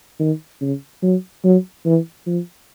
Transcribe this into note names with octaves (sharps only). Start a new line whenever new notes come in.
D#3
C#3
F#3
F#3
E3
F3